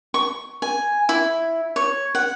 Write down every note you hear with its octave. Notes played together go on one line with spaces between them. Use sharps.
C#6
G#5
E4
C#5
F#5